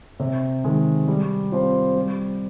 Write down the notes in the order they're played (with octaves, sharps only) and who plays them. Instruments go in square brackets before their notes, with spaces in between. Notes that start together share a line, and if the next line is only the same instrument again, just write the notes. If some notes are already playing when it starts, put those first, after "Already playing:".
[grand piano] C3
D#3 G#3
G3
C4 F4 C5
G3